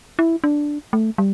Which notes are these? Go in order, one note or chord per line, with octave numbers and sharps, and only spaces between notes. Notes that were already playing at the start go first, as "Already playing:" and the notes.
E4
D4
A3
G3